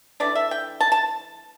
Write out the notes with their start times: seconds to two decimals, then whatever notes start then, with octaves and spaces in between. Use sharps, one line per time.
0.20 E3 A3 D4 D5
0.35 E5
0.51 G5
0.80 A5
0.92 A5